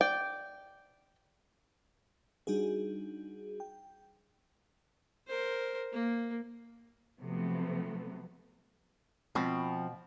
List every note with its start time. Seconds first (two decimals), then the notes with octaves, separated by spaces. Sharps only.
0.01 D5 G5
2.47 G3 D4 D#4 F#4 G#4
3.60 G5
5.28 A#4 C5
5.92 A#3
7.22 C3 F3 F#3 A3 B3
9.35 B2 F3 C4